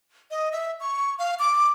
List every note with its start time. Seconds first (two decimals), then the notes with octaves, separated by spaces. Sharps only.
0.31 D#5
0.52 E5
0.80 C#6
1.19 F5
1.39 D6